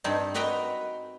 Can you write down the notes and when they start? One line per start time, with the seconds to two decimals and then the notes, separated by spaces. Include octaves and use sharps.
0.04 G2 G3 C4 D#4
0.34 C4 F#4 B4 D#5 G5 A#5